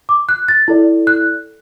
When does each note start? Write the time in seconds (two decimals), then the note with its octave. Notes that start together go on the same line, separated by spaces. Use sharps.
0.09 D6
0.29 F#6
0.48 A6
0.68 E4 A4 D5
1.07 F#6